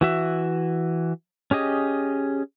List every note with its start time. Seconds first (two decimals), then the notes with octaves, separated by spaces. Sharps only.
0.01 E3 F#4 E5
1.51 C#4 G4 G#4 D#5